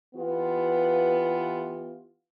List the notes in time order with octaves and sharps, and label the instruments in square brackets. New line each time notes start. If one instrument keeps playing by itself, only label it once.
[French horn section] E3 B3 F4 G4 B4